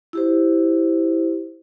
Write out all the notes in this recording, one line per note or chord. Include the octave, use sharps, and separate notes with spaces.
E4 G4 C5